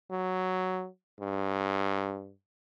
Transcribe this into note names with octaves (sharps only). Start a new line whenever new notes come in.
F#3
G2